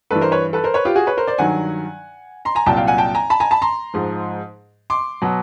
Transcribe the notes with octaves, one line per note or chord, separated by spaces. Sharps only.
G2 E3 A4 B4
A#4 C5
B4 C#5
A4 B4
A#4 C5
B4 C#5
F4 G4
F#4 G#4
B4 C#5
A#4 C5
C5 D5
G2 D#3 F#3 F#5 G#5
A#5 C6
G#5 A#5
C2 A#2 F#3 G5 A5
F5 G5
F#5 G#5
G5 A5
G#5 A#5
A5 B5
G#5 A#5
A5 B5
A#5 C6
G#2 F3
C6 D6
B2 F#3